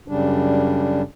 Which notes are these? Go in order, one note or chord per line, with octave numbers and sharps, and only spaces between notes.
F#2 C#3 G3 D4